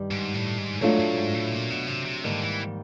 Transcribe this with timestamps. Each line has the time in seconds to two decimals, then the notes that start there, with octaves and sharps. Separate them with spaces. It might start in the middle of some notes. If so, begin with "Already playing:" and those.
Already playing: G2 D#3 G3
0.11 G#2
0.34 A2
0.58 G#2
0.81 G#2 F#3 A3 D4 F4
0.99 A2
1.17 G#2
1.34 A2
1.52 A#2
1.70 B2
1.88 C3
2.06 C3
2.23 G#2 D3 D#3 G3 A#3
2.42 E3